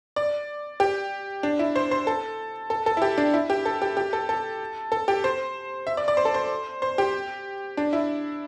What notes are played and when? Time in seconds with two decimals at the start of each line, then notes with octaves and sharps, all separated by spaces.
0.16 D5
0.80 G4
1.43 D4
1.59 E4
1.76 C5
1.91 C5
2.07 A4
2.70 A4
2.86 A4
2.97 E4
3.02 G4
3.18 D4
3.34 E4
3.50 G4
3.65 A4
3.82 G4
3.97 G4
4.13 A4
4.29 A4
4.92 A4
5.08 G4
5.24 C5
5.87 E5
5.97 D5
6.08 D5
6.17 C5
6.25 A4
6.34 C5
6.82 C5
6.98 G4
7.77 D4
7.93 E4